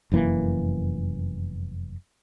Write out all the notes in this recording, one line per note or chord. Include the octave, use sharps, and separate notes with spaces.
F1 F#2 E3 A#3